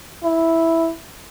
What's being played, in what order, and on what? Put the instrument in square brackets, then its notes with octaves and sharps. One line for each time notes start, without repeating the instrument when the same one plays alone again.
[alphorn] E4